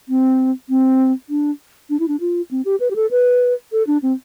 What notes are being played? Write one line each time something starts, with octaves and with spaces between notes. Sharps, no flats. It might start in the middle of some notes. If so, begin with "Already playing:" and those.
C4
C4
D4
D4
E4
D4
F4
C4
G4
B4
G4
A4
B4
A4
D4
C4